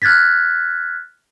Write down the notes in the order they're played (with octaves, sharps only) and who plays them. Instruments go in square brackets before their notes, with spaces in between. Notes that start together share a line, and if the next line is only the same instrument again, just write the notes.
[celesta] F6 F#6 G#6 A6 B6